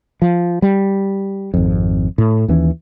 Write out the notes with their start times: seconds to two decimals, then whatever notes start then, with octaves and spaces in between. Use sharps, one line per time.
0.22 F3
0.62 G3
1.54 G#1 F2
2.18 A2
2.48 D#2 E3 C#4